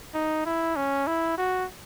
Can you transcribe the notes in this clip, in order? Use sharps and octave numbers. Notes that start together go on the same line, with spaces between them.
D#4
E4
C#4
E4
F#4